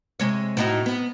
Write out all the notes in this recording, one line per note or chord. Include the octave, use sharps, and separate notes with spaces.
C3 G#3 C#5
A2 D#4 F#4
B3